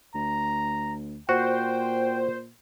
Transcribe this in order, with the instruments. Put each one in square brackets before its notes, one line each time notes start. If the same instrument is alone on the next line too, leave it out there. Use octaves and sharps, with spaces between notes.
[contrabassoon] D2 [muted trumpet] A#5
[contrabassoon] A#2 [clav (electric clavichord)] F#4 [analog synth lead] C5 [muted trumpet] G5